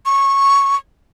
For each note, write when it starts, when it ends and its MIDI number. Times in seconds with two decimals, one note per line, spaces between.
0.06 0.76 85